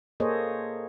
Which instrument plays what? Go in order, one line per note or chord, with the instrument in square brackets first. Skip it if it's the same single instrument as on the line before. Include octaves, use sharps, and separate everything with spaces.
[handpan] A#3 G#4 A4 C5 C#5 D#5